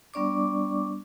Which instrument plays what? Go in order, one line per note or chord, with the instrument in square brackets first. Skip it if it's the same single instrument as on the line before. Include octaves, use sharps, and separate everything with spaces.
[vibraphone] G3 B3 D4 D5 C#6 D6